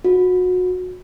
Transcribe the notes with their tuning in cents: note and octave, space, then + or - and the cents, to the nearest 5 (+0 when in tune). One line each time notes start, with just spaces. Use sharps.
F#4 -25